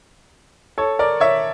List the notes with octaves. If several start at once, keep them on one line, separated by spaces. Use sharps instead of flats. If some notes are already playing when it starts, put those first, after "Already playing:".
A4 C#5
A#4 D5
C#5 E5